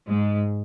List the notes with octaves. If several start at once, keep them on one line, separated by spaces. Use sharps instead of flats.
G#2 G#3